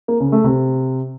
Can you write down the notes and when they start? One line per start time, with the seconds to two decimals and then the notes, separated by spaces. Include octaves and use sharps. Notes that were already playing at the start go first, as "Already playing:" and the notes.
0.08 A#3
0.20 C#3
0.32 A3
0.44 C3